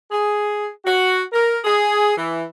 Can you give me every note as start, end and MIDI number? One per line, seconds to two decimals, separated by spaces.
0.11 0.67 68
0.85 1.22 66
1.32 1.58 70
1.64 2.12 68
2.17 2.43 52